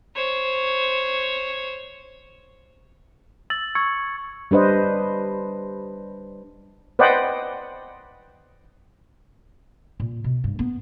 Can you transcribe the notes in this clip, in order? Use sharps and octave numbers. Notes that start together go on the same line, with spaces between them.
C5 C#5
E6 A6 F#7
C#6 E6 G#6 C#7
G3 D4 B4 C5 D#5
B4 C5 D5 D#5 F#5 G5
A#2
B2
G2
B3